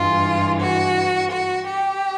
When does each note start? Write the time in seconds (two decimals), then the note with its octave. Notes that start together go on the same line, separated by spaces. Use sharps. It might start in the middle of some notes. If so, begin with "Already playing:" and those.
Already playing: G2 E3 G#3 F4
0.59 F#4
1.30 F#4
1.66 G4